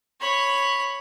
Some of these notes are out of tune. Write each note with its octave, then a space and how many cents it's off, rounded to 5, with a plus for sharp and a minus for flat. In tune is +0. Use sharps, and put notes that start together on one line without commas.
C#5 +0 B5 +0